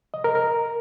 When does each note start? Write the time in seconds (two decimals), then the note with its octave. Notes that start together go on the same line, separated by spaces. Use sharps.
0.14 D#5
0.24 A#4
0.35 A#4